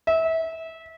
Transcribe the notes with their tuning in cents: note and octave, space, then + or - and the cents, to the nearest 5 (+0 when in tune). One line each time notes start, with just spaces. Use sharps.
E5 -25